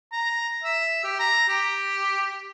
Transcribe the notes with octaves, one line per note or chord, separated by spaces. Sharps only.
A#5
E5
G4
A#5
G4